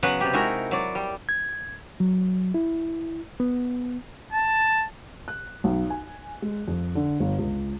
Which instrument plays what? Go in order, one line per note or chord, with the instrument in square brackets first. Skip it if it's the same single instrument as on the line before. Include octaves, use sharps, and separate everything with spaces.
[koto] C#3 F#3 B3 B4 F#5
C3 G4
G#3 D#4 E4 F#4 A#4
F#3 D5
G3
[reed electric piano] G#6
F#3
E4
B3
[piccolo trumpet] A5
[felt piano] F#6
B1
G#5
G#3
F2
D3
G1
C#2